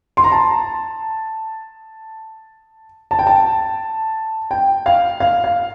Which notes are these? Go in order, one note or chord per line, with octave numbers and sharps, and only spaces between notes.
C6
A#5
A5
A5
G5
A5
G5
F5
F5
F5